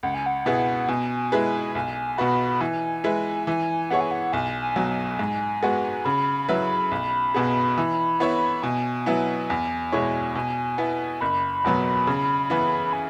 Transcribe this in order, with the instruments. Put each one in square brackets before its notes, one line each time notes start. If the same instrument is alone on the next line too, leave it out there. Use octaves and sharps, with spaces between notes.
[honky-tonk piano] C#2 [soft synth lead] F#5
[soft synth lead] G#5
F#5
[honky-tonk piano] B2 B3 E4 G#4
[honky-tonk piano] B2 [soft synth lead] G#5
[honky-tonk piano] G#3 E4 G#4 B4
[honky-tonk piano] B1 [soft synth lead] G#5
[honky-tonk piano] B2 B3 F#4 [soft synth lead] B5
[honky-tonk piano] E3 [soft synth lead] G#5
[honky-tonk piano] G#3 E4 B4
[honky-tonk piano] E3 [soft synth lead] G#5
[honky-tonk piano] B3 E4 G#4 C#5 [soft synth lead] F#5
[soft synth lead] G#5
F#5
[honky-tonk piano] B1 [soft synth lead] G#5
[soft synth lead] G#5
[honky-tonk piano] B2 F#3
[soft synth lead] G#5
[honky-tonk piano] G#2
G#3 B3 F#4
[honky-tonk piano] C#3 [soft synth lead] B5
[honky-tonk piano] F#3 E4 B4 E5
B1
B2 B3 G#4
E3
B3 E4 C#5 E5
[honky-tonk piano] B2 [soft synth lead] G#5
[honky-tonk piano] F#3 B3 E4
E2
B2 G#3 E4 C#5
[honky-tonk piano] B2 [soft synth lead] G#5
[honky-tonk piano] B3 E4
[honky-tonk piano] F#1 [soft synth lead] B5
[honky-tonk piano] E2 B2 F#3 B3
C#3
E3 B3 E4
[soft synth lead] G#5